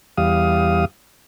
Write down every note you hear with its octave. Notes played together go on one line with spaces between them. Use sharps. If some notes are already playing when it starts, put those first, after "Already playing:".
E2 G3 F5 D#6